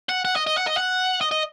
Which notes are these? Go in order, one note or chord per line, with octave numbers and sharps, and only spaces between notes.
F#5
F#5
D#5
D#5
F#5
D#5
F#5
D#5
D#5